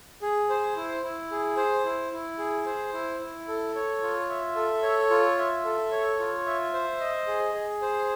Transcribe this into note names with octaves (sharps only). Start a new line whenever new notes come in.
G#4
C5
E4
E4
G#4
C5
E4
E4
G#4
C5
E4
E4
A4
C#5
F4
E5
A4
C#5
F4
E5
A4
C#5
F4
E5
C5
D#5
G#4
G#4
C5